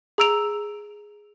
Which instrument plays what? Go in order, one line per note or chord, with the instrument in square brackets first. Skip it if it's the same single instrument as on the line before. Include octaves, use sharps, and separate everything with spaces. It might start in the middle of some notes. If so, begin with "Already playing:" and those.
[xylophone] G#4 A#5 E6 D7 F7